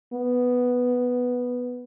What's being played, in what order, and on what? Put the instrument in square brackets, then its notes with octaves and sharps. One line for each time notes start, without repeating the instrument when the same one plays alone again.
[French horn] B3